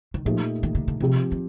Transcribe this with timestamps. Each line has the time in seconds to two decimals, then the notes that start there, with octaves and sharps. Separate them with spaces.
0.14 D#3
0.25 A#2 F3 A3 D#4 G4
0.63 D#3
0.75 D3
0.88 D3
1.00 C3 F3 C4 G4
1.32 D#3